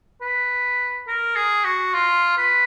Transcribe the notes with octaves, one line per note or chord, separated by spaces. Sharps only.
B4
A#4
G#4
F#4
F4
B4